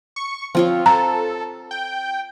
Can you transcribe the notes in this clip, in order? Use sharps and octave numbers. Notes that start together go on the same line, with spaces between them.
C#6
F3 C4 F4 C#5
A4 A#5
G5